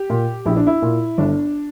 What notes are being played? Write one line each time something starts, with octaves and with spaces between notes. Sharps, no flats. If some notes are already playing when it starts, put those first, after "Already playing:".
Already playing: G4
A#2
A#1 E4
D4
E4
A#2
G1 D4